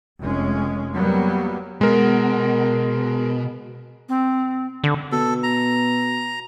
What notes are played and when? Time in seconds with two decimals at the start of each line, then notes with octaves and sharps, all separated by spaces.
0.21 F1 G#3 C#4
0.95 F#3 G3 A#3 B3
1.81 B2 G#3 A#4
4.09 C4
4.84 D3
5.12 B2 A4
5.43 A#5